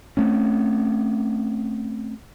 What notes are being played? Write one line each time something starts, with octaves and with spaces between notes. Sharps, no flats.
A3 C4 C#4